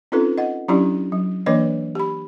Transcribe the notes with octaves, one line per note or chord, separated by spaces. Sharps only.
C4 C#4 D#4 F4 A4 B4
D#5 F#5
F#3 C#4 D4 E4 G4 D5
F#3
E3 A#3 D4 B4 C#5 D#5
G4 B5